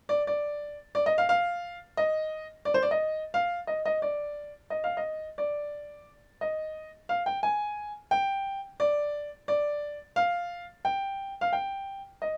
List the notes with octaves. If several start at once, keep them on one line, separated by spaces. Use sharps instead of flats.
D5
D5
D5
D#5
F5
F5
D#5
D5
C5
D5
D#5
F5
D#5
D#5
D5
D#5
F5
D#5
D5
D#5
F5
G5
G#5
G5
D5
D5
F5
G5
F5
G5
D#5